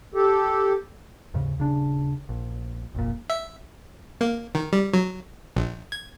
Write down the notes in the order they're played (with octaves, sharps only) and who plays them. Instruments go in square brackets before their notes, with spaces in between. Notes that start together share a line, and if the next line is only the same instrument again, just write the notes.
[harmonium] G4 A4
[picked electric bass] D#2 G#2 C#3
D#1 C#3 D4
A#1
F1 A#1 A#2
[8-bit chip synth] E5
A#3
D#3
G3
F#3
A#1
G#6